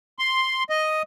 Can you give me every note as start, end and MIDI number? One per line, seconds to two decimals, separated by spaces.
0.19 0.64 84
0.70 1.02 75